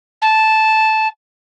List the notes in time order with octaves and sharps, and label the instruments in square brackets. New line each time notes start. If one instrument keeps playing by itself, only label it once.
[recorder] A5